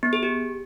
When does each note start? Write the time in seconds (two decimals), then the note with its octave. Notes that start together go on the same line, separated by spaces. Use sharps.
0.03 B3
0.13 G#4
0.23 G4